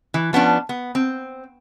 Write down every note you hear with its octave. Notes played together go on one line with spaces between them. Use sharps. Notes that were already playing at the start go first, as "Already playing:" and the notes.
E3
F3 B3 C#4 D4
B3
C4